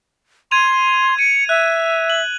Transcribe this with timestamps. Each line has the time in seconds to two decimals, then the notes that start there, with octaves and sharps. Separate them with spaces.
0.51 C6 G#6 D#7 F7
1.19 C#7 D#7
1.49 E5 F#6
2.10 F#7